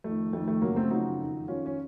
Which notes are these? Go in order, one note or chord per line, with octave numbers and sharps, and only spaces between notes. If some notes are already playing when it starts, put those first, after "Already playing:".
F2 D#3 A3
F2 D#3 A3
A3
F#2 C#3 F3 F#3 A#3
A3 C4
F#2 C#3 F3 D#4 F#4
F2 D#3
F2 D#3 C#4 F4
C#4